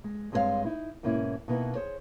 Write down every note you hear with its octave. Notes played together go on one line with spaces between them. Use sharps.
G#3
G2 G#3 C4 A4 C#5 F5
D#4 E4
G#2 B2 A#3 C#4 E4
B2 A#3 B3 D#4 E4
G#4 C5 C#5